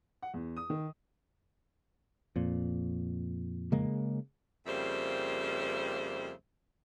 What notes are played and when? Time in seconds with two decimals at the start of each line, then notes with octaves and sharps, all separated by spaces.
0.22 F#5
0.34 E2
0.57 D#6
0.70 D#3
2.36 F2 A#2
3.72 C#3 G#3 A#3
4.67 F2 C#3 G3 A#3 C5 E5